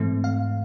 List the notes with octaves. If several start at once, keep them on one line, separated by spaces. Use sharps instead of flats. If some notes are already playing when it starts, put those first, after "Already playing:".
Already playing: G#2 E3 A3 C4
F5